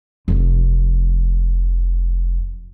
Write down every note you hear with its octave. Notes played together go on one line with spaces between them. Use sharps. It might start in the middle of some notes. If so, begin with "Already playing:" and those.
F1 F2